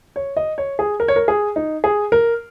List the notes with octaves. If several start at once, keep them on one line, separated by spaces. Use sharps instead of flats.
C#5
D#5
C#5
G#4
A#4
C#5
A#4
G#4
D#4
G#4
A#4